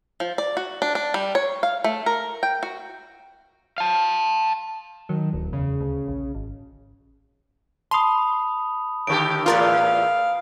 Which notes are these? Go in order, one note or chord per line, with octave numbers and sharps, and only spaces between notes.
F3
D5
F#4
D4
D4
G3
C#5
F5
A3
A#4
G5
F#4
F5 A5
D#3 F#3
D1 D2
E2 C#3
D2
A#1
G#1
A5 B5 C6 D#6
A2 D3 G4 D7
E2 A2 F4 A#4 D5 F5